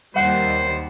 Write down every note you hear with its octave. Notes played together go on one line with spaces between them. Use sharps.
D#2 G3 C5 F#5